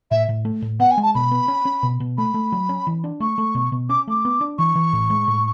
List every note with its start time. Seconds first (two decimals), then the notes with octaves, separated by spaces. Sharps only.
0.11 A2 E5
0.29 A2
0.45 A3
0.62 A2
0.80 B3 F#5
0.91 G#5
0.98 G#3
1.03 A5
1.15 B2 B5
1.31 B3
1.48 C#4
1.65 C#4
1.83 B2
2.00 B2
2.18 A3 B5
2.34 A3
2.52 F#3
2.69 C#4
2.87 E3
3.04 D4
3.20 A3 C#6
3.38 A3
3.55 B2
3.72 B2
3.89 C#4 D6
4.07 A3 D6
4.25 B3
4.41 D4
4.58 E3 C#6
4.75 E3
4.93 A2
5.10 G#3
5.28 A2